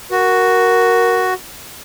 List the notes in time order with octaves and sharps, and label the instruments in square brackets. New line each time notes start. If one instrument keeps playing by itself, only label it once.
[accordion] F#4 [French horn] A#4